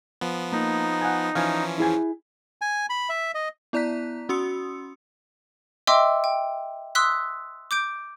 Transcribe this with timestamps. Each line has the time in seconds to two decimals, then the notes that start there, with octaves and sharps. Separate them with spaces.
0.21 F3 B3
0.52 A#3 D#4
1.02 F#5 G#5
1.35 E3 F3 C#4 F5 G#5
1.78 E4 G#4 G#5
2.62 G#5
2.90 B5
3.09 E5
3.34 D#5
3.73 B3 E4 D5 A#5 F#6 B6
4.29 C#4 F#4 C6 D#6 E6 C#7
5.87 D#5 E5 G5 C6 D6 E6
6.24 G5
6.95 C6 D#6 E6 F#6 B6
7.71 D6 G6 D7